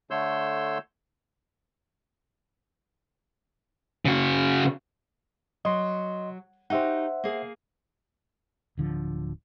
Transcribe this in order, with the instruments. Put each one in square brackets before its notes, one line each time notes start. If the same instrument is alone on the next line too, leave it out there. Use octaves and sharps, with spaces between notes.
[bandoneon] D3 A3 C#5 C6 E6 G6
[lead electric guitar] C#3 F#4
[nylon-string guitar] F#3 [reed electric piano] D#5 C6
[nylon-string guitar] D#4 F#4 G4 [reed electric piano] C5 E5 F#5
[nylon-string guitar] A#3 G#4
[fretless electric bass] D1 D3 F3